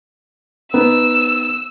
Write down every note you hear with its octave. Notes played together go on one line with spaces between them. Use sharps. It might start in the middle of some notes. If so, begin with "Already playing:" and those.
B3 D#4 E6